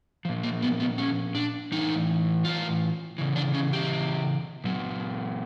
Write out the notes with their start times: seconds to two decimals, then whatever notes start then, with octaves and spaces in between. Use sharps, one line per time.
0.25 A#2 F3
0.43 A#3
0.62 B3
0.80 B3
0.98 C#4
1.35 D4
1.72 A2 E3 D#4
2.45 F4
3.18 C#3 E3
3.36 D4
3.54 C#4
3.73 G4
4.64 A#2 F#3